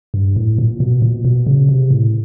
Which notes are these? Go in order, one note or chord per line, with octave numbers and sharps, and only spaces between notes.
G2
A2
A#2
B2
A#2
B2
C#3
C3
A2